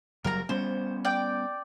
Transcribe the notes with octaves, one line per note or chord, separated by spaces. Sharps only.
F#1 F#3 G3 A#4 A#5
G3 B3 C#4 C5
D5 G5